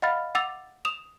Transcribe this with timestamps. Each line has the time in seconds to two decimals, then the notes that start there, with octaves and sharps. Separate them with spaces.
0.02 D#5 F5 F#5 B5 F6 A6
0.35 F#5 D6 E6 A6 F7
0.85 D#6 E7 F7